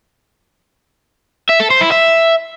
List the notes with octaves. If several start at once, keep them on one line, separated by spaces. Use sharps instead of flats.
E5
A4
C5
E4
E5